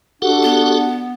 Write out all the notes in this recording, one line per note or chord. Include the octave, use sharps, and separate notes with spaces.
D4 F#4 G4 A4 F#5
B3